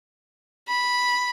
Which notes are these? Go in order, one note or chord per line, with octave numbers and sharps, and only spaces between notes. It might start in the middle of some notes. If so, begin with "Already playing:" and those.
B5